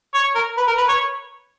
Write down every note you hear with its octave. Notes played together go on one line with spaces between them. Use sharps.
C#5
A#4
B4
A#4
B4
C#5